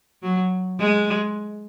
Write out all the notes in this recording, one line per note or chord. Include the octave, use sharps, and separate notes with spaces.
F#3
G#3